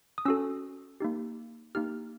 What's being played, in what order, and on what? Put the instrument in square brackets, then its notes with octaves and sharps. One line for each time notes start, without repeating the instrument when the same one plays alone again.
[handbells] D#6
C#4 F#4 A4 E6
A#3 D#4 G4
A#3 D#4 G4 F6